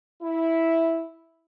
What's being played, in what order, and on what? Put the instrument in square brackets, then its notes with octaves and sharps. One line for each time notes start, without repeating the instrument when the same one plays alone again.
[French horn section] E4